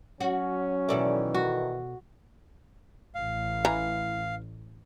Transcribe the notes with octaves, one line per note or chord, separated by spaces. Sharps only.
F#3 C#4 F#4
B2 D#3 E3 A4 D5
F#4
A1 F5
E3 A#5